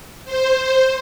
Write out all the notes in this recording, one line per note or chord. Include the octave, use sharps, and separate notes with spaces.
C5